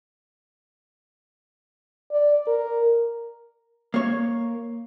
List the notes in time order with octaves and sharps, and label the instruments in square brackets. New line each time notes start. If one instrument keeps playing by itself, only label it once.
[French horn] D5
A#4
[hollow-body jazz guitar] A#3 C#5